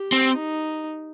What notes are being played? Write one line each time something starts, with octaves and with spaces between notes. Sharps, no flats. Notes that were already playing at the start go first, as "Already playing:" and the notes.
Already playing: G4
C4
D#4